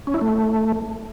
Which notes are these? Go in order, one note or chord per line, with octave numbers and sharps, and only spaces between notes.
C#4
E4
A3